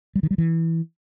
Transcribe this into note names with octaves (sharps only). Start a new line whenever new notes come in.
G3
D#3
G3
E3